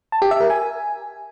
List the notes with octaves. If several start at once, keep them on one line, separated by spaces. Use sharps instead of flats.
A5
G4
E5
A#4
G#5